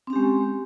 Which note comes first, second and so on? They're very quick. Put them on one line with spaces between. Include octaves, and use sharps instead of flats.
C4 C#4 G4 G#3